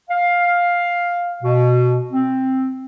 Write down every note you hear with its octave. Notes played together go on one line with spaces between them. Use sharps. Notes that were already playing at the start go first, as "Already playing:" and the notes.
F5
B2
C4